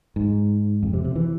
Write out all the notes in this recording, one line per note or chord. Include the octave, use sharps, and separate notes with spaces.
G#2
F2
C3
C3
E3